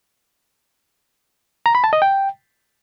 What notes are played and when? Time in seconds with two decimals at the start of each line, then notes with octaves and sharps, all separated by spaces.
1.66 A#5
1.75 B5
1.84 A5
1.93 D#5
2.02 G5